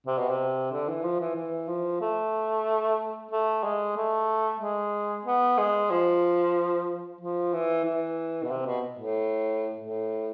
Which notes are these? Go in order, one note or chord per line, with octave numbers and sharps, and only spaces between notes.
C3
B2
C3
D3
E3
F3
E3
E3
F3
A3
A3
G#3
A3
G#3
B3
G#3
F3
F3
E3
E3
B2
C3
B2
A2
A2